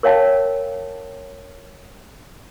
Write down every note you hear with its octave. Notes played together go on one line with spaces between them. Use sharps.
A#4 C#5 F5 G5 A5